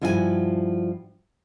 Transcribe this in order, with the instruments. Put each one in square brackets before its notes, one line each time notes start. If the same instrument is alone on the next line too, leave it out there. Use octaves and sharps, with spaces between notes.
[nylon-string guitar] G2 F3 E4 F#4 A#4 G#5